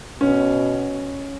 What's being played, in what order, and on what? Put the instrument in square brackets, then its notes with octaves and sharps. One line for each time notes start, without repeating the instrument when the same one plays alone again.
[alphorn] B2 [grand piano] C#4